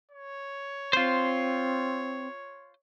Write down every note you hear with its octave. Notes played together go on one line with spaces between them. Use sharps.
C#5
C4 F4 C5